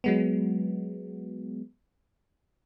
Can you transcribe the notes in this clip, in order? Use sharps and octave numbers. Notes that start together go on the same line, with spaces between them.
F#3 G#3 B3